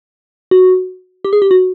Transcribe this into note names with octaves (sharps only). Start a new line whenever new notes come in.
F#4
G4
G#4
G4
F#4